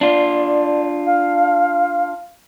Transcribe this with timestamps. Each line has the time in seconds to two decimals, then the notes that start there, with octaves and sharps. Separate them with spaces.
0.01 D4 F4 D5
1.05 F5